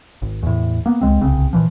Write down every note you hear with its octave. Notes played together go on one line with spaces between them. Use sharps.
G#1
E2 A2
A#3 B3
C#2 G#2 G#3 C4
D1 C2 C#3 C4
A#2 E3 F3